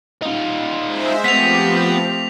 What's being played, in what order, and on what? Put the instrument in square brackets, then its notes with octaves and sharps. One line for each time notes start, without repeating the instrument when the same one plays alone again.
[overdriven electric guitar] D#4 F4
[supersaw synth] G#3 C5 E5
[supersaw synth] F3 G4 [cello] A3 C4 [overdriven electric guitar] B3 [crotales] B6 F7